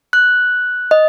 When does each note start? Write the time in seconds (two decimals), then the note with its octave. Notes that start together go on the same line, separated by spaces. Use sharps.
0.13 F#6
0.91 D#5